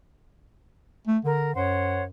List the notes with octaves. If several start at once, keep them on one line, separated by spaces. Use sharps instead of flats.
A3
D3 A#4
F#2 C5 C#5 F#5